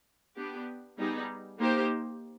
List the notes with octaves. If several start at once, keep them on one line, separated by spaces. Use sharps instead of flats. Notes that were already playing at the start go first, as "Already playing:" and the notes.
B3 D4 G4
G3 B3 D#4 G#4
A#3 D#4 G4 C5